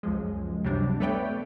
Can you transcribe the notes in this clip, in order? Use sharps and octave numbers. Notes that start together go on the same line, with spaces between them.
C#2 F#2 F3 G#3
C3 F#3 G3 D4
A3 B3 B4 C#5 D5 G5